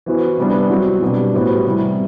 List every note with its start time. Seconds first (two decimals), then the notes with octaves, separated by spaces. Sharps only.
0.06 E3 B3 F#4 C5
0.37 C3 G3 B3 D4
0.70 F#3 C4 F#4
1.02 B2 G3 D4
1.34 A2 G3 B3 F#4 C5
1.65 C3 E3 G3